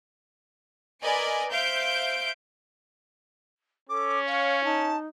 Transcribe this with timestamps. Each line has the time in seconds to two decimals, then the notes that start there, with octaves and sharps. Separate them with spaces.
1.01 A#4 B4 D5 D#5 G#5
1.52 C5 E5 F5 G6 D7
3.89 C#4 A4 D6
4.27 C#5 F5
4.65 D#4 A5